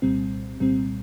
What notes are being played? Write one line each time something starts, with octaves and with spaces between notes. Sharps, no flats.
C2 A#2 G3 C4
C2 A#2 G3 C4